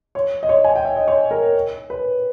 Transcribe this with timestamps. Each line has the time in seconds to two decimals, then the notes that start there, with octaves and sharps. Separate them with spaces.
0.15 C#5
0.43 D#5
0.49 C#5
0.64 G#5
0.75 G5
0.85 E5
0.96 D#5
1.08 C#5
1.31 A#4
1.90 B4